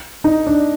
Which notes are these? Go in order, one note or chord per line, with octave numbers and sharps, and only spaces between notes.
D#4
D4